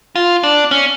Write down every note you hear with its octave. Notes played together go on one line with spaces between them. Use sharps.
F4
D4
C#4